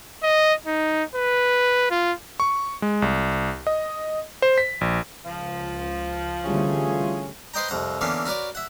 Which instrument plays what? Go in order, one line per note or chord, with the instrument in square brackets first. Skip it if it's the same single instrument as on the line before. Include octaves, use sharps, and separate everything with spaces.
[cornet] D#5
D#4
B4
F4
[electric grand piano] C#6
G#3
C2
D#5
C5
B6
A#1
[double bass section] C#2 [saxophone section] F3
[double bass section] D3 G3 A3 [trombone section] E3 E4 F4 [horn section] C#4 G#4
[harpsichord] B4 C5 D#5 G5 A#5
C2 F2 F#5 A#5
D3 E3 A#3 B3 C#4
F#4 A#4 B4 C#5 D5
E5 F#5